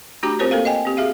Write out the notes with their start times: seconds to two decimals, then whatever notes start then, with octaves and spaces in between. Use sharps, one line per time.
0.23 A3 D4 F#4 G4 A#5 D6
0.39 C4 F4 G4 A#4 C5 C#5
0.51 A#3 A4 A#4 F5
0.65 D#5 G5 G#5
0.85 C4 G4
0.97 F#4 G#4 E5 F5